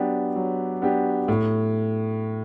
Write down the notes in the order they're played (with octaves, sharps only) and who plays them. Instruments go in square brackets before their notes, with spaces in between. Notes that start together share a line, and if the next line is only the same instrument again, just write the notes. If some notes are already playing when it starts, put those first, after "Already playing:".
Already playing: [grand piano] F#3 B3 D4 G4
F#3
B3 D4 G4
A2